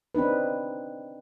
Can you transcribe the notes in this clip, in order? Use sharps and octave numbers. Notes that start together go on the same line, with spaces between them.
C4 D4 D#4 B4